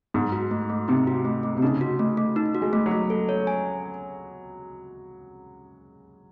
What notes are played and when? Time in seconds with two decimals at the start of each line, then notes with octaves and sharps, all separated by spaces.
0.14 G#2 D#4
0.32 F#4
0.51 A3
0.70 A3
0.88 C3 D#4
1.07 F#4
1.25 A3
1.43 A3
1.57 C3
1.62 C#3 D#4
1.81 F#4
1.99 A3
2.17 A3
2.36 D#4
2.55 F#4
2.62 G#3
2.73 A3
2.86 F#3
2.91 A3
3.10 A4
3.29 C#5
3.47 G#5